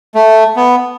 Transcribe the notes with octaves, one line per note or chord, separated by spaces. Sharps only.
A3
B3